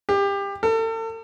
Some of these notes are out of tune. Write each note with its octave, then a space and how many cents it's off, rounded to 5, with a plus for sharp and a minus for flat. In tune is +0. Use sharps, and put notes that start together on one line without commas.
G4 +25
A4 +40